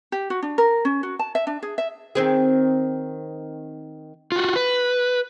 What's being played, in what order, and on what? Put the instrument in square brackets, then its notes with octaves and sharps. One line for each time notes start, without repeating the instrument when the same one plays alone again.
[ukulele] G4
F#4
D4
A#4
C#4
F#4
A5
E5
D4
G#4
E5
[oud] D#3 C4 G#4
[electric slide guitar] F4 F#4
B4